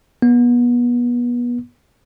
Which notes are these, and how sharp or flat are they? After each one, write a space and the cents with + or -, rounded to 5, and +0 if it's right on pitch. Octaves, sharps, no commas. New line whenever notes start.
B3 -30